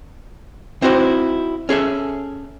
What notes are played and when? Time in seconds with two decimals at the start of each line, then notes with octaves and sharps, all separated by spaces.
0.82 C4 D#4 E4 F#4 A#4 C5
1.69 C#4 G#4 A4 E5